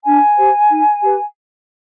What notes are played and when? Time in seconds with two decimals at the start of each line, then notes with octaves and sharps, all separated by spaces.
0.04 D4 G#5
0.37 G4 C5
0.69 D#4
1.02 G4 B4